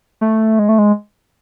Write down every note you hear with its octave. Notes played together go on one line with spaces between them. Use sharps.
A3
G#3
A3
G#3